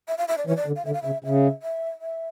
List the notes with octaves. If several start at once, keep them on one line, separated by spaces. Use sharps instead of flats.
E5
F5
E5
D5
E3 C#5
D5
D3
F5
D3 E5
F5
C#3 E5
C#3 E5
E5
E5